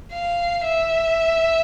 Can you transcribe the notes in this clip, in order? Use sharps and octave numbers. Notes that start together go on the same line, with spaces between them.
F5
E5